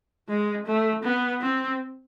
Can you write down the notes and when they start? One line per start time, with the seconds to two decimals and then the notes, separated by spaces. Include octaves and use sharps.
0.29 G#3
0.66 A3
1.04 B3
1.42 C4